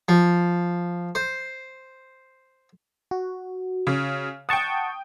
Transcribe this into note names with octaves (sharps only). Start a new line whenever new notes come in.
F3
C5
F#4
C#3
F#5 G5 A5 C#6 D#6